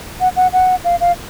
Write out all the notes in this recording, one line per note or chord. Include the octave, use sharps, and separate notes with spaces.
F#5
F#5
F#5
F5
F5